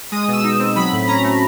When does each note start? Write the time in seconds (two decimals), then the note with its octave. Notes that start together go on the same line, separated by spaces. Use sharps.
0.12 G#3 D#6
0.28 B2 E6
0.44 D#4
0.59 C4
0.76 F#3 B5
0.93 A2
1.08 C#4 A#5
1.24 A3